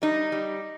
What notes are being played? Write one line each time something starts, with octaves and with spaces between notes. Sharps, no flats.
G3 D#4
G3